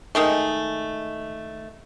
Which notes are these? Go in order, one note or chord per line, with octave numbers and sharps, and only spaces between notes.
D#3 G#3 A3